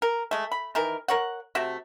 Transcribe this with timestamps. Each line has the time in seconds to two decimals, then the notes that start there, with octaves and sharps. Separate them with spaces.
0.02 A#4
0.31 G#3 A3
0.52 B5
0.75 D#3 E3 A#4
1.08 A#4 C#5 F#5
1.55 C3 A3 F#4 E5